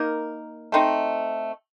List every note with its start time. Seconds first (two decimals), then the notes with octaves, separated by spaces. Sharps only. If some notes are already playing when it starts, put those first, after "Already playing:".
Already playing: A#3 D#4 A#4
0.72 A3 C4 D#4